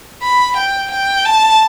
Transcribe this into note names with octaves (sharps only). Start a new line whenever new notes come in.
B5
G5
G5
A5